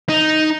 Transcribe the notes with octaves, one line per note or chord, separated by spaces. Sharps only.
D#4